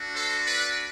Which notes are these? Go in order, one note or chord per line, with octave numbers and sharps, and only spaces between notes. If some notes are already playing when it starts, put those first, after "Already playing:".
Already playing: A3 D4 F#4
A4 C5
B4 D5